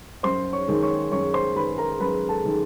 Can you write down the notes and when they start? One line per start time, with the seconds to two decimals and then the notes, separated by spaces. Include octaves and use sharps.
0.23 F#2 C5 C6
0.53 C#5 C#6
0.68 D#3 G#3
0.83 C#5 C#6
1.11 F#2 C#5 C#6
1.34 C5 C6
1.55 D#3 G#3 B4 B5
1.78 A#4 A#5
2.00 F#2 B4 B5
2.29 A4 A5
2.45 D#3 G#3